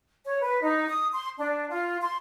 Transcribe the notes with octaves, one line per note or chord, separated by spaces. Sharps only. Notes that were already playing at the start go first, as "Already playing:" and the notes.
C#5
B4
D#4
D#6
C6
D4
F4
C6